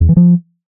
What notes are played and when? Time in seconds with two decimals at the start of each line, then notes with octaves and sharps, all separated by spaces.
0.01 E2
0.09 E3
0.17 F3